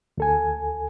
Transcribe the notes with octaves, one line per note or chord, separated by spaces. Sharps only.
D2 A4 G#5